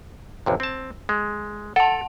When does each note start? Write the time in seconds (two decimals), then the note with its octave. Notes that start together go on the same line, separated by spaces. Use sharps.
0.46 A1 F2 C3
0.60 C4 A5
1.09 G#3
1.76 A4 F#5 A5